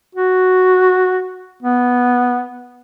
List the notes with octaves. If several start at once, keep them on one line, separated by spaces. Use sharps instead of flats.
F#4
B3